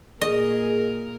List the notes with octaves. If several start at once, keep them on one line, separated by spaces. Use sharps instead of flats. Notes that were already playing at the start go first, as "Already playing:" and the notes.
A#2 G#4 A#4 D#5